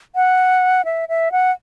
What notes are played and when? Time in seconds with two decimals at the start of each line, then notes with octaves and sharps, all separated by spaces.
0.15 F#5
0.85 E5
1.09 E5
1.32 F#5